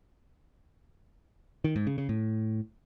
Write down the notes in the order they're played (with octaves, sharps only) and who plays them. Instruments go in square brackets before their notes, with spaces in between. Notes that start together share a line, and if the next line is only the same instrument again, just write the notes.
[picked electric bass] D#3
G#2
C#3
C#3
A2